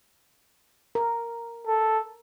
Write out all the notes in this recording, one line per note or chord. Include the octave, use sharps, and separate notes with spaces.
A#4
A4